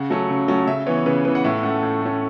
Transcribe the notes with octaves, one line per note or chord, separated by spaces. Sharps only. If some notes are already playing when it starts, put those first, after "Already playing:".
Already playing: C#3 F#5
F#3 A3 C#4
C#3
F#3 A3 C#4
C#3 E5
E3 B3 C#5
C#3 B4
E3 B3 B4
F#5
A2 E5
A3 C#4 F#5
A2
A3 C#4